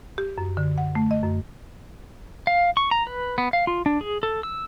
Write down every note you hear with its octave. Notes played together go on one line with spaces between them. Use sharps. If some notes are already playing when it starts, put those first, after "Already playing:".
G4
F#2
D3
F#5
A3
D#5
F#2
F5
C#6
A#5
B4
B3
F5
F4
D4
G#4
A4
E6